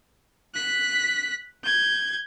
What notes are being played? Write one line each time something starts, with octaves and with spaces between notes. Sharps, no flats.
F#6 B6
G6 G#6